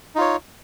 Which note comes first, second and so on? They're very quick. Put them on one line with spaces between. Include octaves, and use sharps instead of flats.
D#4 F4 C#5